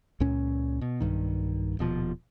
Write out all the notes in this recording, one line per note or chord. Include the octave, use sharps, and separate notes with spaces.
C#2 A#2 C#4
B2
B1 G2 D#3
D#1 B2 F3